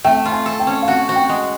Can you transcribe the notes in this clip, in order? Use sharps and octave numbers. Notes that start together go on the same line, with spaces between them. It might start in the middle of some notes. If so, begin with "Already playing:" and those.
A3 G5
F4
G#5
A4
G5
C#4
F5
F#4 F#5
F#4
G5
G#3